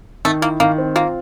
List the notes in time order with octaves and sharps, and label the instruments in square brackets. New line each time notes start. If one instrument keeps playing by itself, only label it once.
[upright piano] D#3 [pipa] A3
[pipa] A#3 [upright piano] E4
[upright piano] D#3 [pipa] A#3
[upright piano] C4
[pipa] A#3 [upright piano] F4